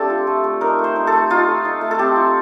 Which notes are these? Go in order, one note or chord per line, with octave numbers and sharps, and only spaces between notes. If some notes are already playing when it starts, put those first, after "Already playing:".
Already playing: A3 C4 D4 G4 A4
F4
A3
A3
D#4 A#4
A3
C5
D#4
A4
A3
D#4 F4
A3
D#4
A3
A4
C4 G4
F4